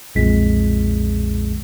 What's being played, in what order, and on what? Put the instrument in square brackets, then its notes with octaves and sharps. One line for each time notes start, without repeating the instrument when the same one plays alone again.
[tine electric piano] B1 F2 A#2 G#3 B6